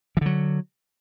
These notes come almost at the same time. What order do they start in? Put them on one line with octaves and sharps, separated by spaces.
E3 D3 F#3